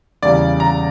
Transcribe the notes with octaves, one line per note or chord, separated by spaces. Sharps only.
E2 C#3 G3 A#3 D5
A#5